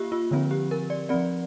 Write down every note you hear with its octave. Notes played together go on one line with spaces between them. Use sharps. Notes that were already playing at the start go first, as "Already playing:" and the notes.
Already playing: A#3 F4 G4
F4
D3 F3 C4
G4
A#4
D5
F3 C4 D5